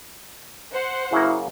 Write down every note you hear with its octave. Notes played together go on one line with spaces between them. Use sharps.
C5 F#5
C#3 F#3 A#3 E4